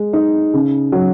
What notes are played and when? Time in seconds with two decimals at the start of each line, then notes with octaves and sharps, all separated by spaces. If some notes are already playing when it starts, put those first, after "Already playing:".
Already playing: G#3
0.13 D#4
0.54 C#3
0.92 F#3